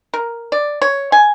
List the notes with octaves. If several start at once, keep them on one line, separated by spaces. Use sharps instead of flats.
A#4
D5
C#5
G#5